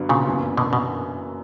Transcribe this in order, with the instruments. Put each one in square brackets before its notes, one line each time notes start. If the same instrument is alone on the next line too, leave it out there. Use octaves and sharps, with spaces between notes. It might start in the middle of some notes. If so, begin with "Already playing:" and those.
Already playing: [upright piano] G2 D3 F#3 B3 D4
[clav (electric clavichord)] A#2 C#3
[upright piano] F#1 F#2 E3 B3 D4
[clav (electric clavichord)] B2 D3
B2